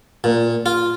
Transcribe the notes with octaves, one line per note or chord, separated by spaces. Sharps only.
A#2
F4